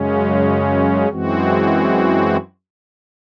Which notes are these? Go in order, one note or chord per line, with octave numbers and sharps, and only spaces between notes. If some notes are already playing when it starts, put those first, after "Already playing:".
Already playing: F#2 C#3 G#3 C#4
F#2 E3 G#3 C4 F#4